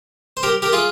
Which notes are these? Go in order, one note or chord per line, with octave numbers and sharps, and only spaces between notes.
C5
G4 A#4
G4 A#4
F4 G#4